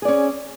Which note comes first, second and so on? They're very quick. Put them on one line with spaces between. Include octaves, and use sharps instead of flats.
G#4 D5 C#4